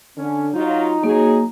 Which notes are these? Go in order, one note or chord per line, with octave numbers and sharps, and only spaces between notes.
D3 C#4
F#3 D#4 F4
F#3 A#3 G#4